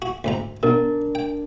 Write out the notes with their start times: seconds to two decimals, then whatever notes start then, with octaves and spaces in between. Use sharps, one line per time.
0.02 F#4
0.24 D2 G#2 A#5
0.63 B2 D4 A#4
1.15 G5